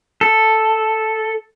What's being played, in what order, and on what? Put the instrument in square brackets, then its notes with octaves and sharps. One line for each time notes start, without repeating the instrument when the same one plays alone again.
[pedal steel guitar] A4